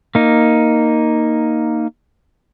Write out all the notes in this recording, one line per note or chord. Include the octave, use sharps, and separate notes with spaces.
A#3 D#4